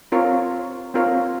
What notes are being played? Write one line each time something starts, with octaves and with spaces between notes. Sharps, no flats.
C4 F4 A#4 C#5
C4 F4 A#4 C#5